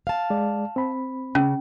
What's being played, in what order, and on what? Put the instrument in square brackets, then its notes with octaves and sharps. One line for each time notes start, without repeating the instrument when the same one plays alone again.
[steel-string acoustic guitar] F5 A5
[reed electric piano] G#3 D5
C4 B5
[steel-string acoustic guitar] C#3 [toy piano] C#4